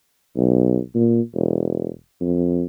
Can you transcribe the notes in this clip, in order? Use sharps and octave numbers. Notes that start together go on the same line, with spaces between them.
B1
A#2
E1
F2